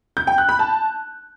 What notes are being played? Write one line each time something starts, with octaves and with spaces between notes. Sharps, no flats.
G6
G5
F#6
B5
A5